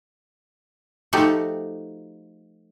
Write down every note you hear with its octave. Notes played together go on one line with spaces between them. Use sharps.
F3 A3 D#4 F#4 G4